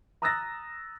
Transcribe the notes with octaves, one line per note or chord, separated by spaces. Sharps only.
A#5 D#6 E6 F#6 A6 A#6